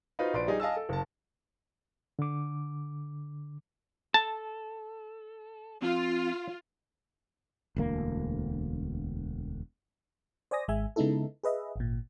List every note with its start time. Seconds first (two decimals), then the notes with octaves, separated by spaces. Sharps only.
0.19 D#4 F4 F#4 B4 C5
0.33 A#1 B4 D5 C6 D7
0.47 G3 D#4 G#4
0.60 D#5 F5 G#5 A5 E6
0.76 A4
0.89 F#1 A5
2.19 D3 D6
4.14 A4 A5
5.82 F3 C4 F4
7.76 E1 D2 A#3
10.51 C5 D5 G#5 D#6 A#6
10.68 G#1 G#3 E5 G#5
10.96 C#3 G#3 B3 D#4 E4 A4
11.43 G#4 B4 D#5 E5
11.76 G#1 A#2